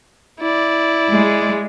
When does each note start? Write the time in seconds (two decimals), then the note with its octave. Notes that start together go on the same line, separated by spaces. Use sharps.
0.40 E4 D5
1.12 G#3